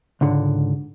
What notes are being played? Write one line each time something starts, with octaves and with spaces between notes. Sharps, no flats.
C#2 G#2 D3